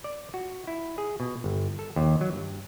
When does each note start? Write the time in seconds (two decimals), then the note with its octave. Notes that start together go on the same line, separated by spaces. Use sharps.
0.04 D5
0.34 F#4
0.67 E4
0.98 G#4
1.20 B2
1.44 G1
1.79 A4
1.96 D#2
2.21 F#3
2.33 G2